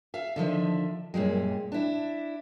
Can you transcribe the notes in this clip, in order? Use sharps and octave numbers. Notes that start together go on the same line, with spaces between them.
E5 F5
D3 D#3 F3 E5
F#2 A#2 G3 G#3
D4 E4